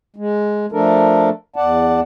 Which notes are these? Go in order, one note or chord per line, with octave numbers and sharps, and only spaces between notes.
G#3
F3 A3 D4 A4 A#4
E2 D5 F#5 A5